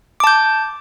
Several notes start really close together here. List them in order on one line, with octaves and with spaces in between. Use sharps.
D6 A5 G6